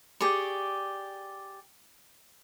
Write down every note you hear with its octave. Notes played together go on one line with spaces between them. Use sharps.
G4 G#4 D5 C#6